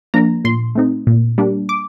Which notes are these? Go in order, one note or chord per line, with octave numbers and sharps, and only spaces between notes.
F3 A#3 D4 A#5
A#2 C6
A3 C4 D#4
A#2
G3 A#3 D4
D6